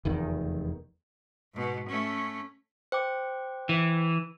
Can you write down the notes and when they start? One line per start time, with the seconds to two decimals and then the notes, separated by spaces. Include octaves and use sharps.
0.05 F1 E2 D#3
1.54 G#2 B2
1.89 A3 C#4
2.92 C5 G5 D6
3.69 E3